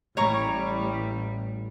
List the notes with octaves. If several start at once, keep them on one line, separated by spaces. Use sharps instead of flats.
A1 G3 C#5 A#5 C#6